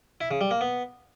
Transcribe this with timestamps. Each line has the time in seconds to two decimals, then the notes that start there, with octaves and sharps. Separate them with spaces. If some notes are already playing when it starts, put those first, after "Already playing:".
0.21 E4
0.31 C#3
0.41 G3
0.51 A#3
0.61 B3